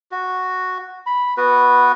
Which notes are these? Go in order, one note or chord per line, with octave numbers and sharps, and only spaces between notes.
F#4
B5
B3 F#4 B4